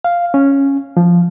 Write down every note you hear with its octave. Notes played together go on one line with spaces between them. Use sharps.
F5
C#4
F3